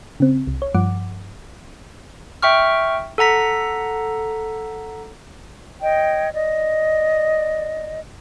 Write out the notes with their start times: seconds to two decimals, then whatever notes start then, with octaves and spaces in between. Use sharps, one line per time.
0.20 C#3 C4
0.47 C2
0.62 C#5
0.74 G2 F3 F#5 D6
2.42 E5 G5 C#6 F6
3.18 A4 F#5 A#5 B6
5.80 C#5 D#5 G5
6.32 D5 D#5